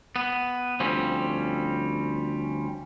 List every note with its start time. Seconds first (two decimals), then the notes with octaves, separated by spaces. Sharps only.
0.16 B3
0.80 D2 F3 G3 C4 C#4